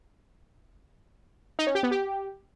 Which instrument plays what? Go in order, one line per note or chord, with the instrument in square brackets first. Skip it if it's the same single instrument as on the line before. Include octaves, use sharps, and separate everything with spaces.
[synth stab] D#4
C#4
G4
B3
G4